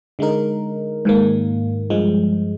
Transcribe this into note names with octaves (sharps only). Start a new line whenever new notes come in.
D3 G#3 D#4 A#4
G#2 D#3 A#3
G2 F3 G#3